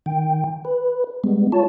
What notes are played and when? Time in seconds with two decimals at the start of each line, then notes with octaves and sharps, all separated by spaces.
0.06 D#3 G5
0.65 B4
1.24 G3 G#3 B3
1.52 F4 C#5 A5